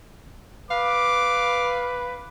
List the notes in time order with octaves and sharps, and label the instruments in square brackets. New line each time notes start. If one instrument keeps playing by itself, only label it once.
[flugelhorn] B4 [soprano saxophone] F5 [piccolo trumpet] D6